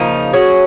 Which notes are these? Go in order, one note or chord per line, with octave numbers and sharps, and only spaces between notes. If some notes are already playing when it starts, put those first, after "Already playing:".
Already playing: C#3 F3 A#3 D#4
F#3 C#4 G#4